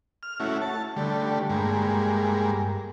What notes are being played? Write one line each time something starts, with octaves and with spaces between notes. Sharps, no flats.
F6
A3 C#4 E4 F#4
A5
D3 G3 A3
G2 G#3 A#3